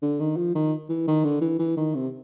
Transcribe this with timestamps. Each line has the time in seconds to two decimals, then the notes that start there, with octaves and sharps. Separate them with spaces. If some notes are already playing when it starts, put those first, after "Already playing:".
0.02 D3
0.20 D#3
0.37 F3
0.55 D#3
0.89 E3
1.07 D#3
1.24 D3
1.41 E3
1.59 E3
1.77 D#3
1.95 C3